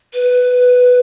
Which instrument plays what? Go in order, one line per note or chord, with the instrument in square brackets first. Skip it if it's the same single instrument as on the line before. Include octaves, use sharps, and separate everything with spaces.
[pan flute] B4